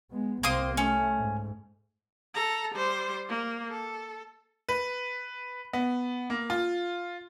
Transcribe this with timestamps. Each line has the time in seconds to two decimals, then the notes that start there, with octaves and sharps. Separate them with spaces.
0.11 G#3 B3
0.43 C2 A#3 C4 C6 D#6
0.77 A3 C#4
1.18 G#2
2.35 A4 A#5
2.74 G3 C5
3.29 A#3
3.70 A4
4.69 B4
5.73 B3
6.30 A#3
6.50 F4